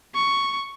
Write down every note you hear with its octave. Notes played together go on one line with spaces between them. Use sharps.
C#6